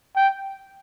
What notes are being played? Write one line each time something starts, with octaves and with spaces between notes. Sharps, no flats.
G5